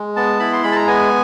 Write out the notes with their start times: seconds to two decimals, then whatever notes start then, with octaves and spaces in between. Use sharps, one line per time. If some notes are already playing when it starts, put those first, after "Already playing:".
Already playing: G#3
0.16 B3 A5
0.39 E4 B5
0.52 C6
0.63 G#3 B5
0.72 A5
0.76 A#5
0.87 B3 G#5